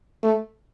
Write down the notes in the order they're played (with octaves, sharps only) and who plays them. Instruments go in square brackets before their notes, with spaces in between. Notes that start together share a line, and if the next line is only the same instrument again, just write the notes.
[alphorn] A3